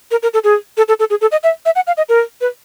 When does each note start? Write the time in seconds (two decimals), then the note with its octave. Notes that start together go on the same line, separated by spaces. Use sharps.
0.11 A#4
0.23 A#4
0.34 A4
0.44 G#4
0.77 A4
0.88 A4
0.99 A4
1.10 G#4
1.21 A4
1.32 D#5
1.43 E5
1.66 E5
1.76 F#5
1.87 F5
1.97 D#5
2.09 A#4
2.41 B4